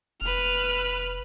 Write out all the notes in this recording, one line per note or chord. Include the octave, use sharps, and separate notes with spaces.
F1 B4 F6